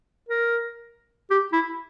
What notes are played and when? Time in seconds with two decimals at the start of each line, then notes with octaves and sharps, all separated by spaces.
0.29 A#4
1.30 G4
1.53 E4